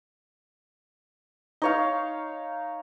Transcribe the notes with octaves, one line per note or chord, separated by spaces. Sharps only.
D#4 C#5 F5